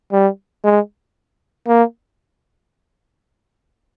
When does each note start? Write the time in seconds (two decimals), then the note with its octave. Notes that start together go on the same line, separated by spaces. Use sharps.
0.12 G3
0.64 G#3
1.68 A#3